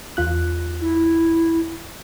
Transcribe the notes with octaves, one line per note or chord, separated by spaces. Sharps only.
E2 F4 F#6
E4